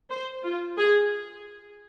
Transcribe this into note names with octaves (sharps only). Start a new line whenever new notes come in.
C5
F4
G#4